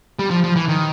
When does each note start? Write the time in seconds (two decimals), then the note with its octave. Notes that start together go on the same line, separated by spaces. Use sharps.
0.19 G3
0.30 F3
0.44 F3
0.56 E3
0.68 D#3